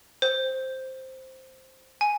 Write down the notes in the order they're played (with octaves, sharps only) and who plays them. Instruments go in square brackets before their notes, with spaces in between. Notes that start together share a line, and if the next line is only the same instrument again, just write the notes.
[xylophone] C5
G#5